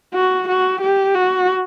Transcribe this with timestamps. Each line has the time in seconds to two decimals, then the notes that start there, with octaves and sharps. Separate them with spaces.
0.14 F#4
0.48 F#4
0.81 G4
1.15 F#4